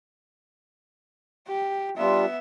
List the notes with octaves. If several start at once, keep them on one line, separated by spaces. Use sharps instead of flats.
G4
G3 B3 D4 F4 E5